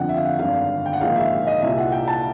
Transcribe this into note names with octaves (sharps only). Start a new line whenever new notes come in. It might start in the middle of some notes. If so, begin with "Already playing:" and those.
Already playing: G1 F2 D3 F#5 G5
E5
F5
F#5
G#1 G2 D3 F5
G5
F#5
A#1 G#2 D#3 F5
E5
D#5
C2 A#2 E5
F#5
G5
A5